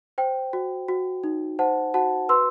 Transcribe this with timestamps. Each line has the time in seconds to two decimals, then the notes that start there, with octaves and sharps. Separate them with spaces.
0.18 C5 G5
0.53 F#4
0.88 F#4
1.24 D#4
1.59 C5 F#5 A5
1.94 F#4 F#5 A5
2.29 B4 C6 E6